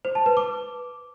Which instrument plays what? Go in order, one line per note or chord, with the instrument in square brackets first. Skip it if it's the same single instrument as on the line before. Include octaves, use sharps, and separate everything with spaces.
[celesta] C5
A5
B4
D6